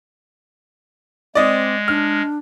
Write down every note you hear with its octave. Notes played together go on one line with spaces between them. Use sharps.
G#3 C4 D5 D#5
D4 F6